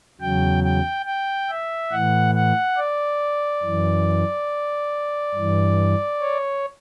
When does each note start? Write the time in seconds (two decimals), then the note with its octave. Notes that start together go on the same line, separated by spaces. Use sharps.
0.21 E2 C#3 F#3 G5
0.64 G5
1.06 G5
1.50 E5
1.91 A2 E3 F#5
2.34 F#5
2.78 D5
3.63 F#2 E3
5.35 G2 E3
6.21 C#5